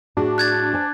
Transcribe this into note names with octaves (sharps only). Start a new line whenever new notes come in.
A2 D4 F#4 G#4
F#6 G#6 A6
C5 G#5 A5